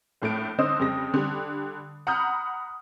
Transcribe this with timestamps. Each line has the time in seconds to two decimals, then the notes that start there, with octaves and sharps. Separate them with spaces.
0.22 A#1 A2 A3 D7
0.59 D3 D#4 C5 D#5 D#6 E6
0.79 F2 C#3 G3 G5 A#6
1.14 D3 G3
2.07 F#5 A#5 B5 D#6 F6 G6